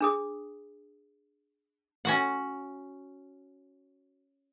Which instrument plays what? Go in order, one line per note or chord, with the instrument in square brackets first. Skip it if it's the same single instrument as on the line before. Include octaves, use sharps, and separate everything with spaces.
[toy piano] D4 G#4 D#6
[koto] C#4 F#4 F#5